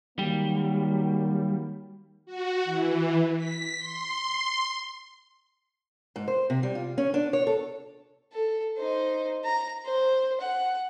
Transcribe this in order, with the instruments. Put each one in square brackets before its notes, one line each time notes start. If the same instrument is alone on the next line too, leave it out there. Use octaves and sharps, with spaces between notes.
[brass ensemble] D#3 F#3 A#3 [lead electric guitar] G3
[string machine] F#4
E3
B6
C6
[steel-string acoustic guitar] G#2
C5
C3
G3
F4
C#4
D4
C#5
A4
[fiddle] A4
D#4 C5
A#5
C5
F#5